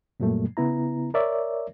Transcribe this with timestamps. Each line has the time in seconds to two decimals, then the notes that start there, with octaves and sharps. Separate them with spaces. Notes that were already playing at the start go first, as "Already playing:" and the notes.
0.20 F#2 A#2 F#3 G3 A3 A#3
0.57 C#3 B3 E4 A#5
1.14 A#4 C#5 D5 E5